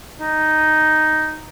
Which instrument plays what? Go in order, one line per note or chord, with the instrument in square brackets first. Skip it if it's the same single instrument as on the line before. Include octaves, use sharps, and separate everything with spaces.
[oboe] D#4